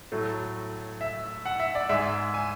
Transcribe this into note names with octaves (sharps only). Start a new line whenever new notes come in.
A2 F#3 A3
E5
F#5
E5
D5
G#2 G#3 E5
G#5